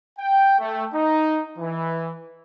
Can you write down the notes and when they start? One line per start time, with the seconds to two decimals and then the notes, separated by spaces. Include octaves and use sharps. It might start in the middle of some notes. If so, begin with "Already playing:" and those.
0.19 G5
0.59 A3
0.94 D#4
1.58 E3